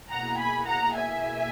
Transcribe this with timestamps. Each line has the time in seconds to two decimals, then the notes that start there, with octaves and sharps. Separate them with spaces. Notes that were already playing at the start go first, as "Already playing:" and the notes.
0.10 B2 A#3 E4 G#4 F#5 A#5
0.38 G#5 B5
0.67 F#5 A#5
0.96 E5 G#5